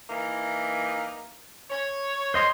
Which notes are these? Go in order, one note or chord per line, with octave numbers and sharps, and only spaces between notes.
E3 A#3 D#4
C#5
C5 D#5 C6